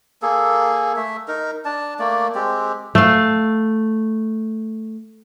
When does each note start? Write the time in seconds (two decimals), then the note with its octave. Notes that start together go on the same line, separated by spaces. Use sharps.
0.22 A#3 G#4 A4
0.96 A3 E5
1.28 D#4 A#4
1.65 D4 A5
1.99 A3 A#3 D5
2.35 G#3 C4 G4
2.95 A3 F5